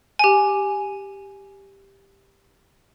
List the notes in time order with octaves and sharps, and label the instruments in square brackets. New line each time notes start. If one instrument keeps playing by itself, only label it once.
[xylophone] G4 G#5